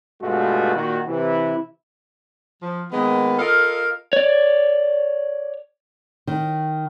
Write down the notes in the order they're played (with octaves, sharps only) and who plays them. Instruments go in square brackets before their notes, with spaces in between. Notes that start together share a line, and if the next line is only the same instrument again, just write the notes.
[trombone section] G2 B2 G#3 A3 F4 F#4
A#2 D#3 F#4
C3 E3 E4
[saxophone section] F3
D#3 G#3 A#3 B3
F4 A4 A#4 D#5 F5
[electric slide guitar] C#5 D5
[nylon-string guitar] D#3